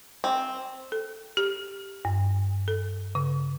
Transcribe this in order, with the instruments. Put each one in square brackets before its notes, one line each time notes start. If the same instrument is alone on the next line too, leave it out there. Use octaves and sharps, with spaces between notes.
[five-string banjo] C4
[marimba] A4
G4
G2
A4
C#3